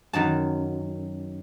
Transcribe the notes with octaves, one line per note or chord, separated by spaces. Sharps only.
F#2 D#3 F#3 A5